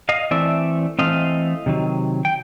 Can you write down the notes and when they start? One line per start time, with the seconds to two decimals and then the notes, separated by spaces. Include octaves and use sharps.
0.09 D#5 F5
0.31 E3 A3 C4 D5 E5
0.99 E3 A3 C4 D#5 F5
1.66 C3 D#3 F#3
2.25 G5